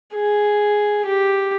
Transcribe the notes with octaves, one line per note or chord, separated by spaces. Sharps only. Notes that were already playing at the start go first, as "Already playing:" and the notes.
G#4
G4